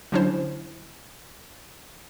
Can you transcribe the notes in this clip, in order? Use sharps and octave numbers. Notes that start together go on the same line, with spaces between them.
D3 F#3 C#4 D4 E4 C5